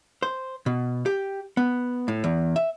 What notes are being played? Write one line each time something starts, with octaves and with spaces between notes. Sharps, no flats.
C5
B2
G4
B3
A2
E2
E5